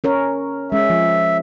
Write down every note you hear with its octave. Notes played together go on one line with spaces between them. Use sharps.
C#4 A#4 C#5
G#3 C#4 E5
F3